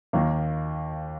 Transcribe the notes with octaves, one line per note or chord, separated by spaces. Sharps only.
D#2 D#3 A#3